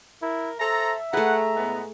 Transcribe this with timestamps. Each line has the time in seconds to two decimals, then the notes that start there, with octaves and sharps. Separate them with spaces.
0.22 E4 A#4
0.60 A4 C5 E5 A#5
1.13 A3 G#4 B4 F#5 A#5
1.56 A2 G#3 B3